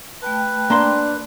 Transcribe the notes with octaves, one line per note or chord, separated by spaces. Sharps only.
A3 B4 G5 A5
A#3 D4 C6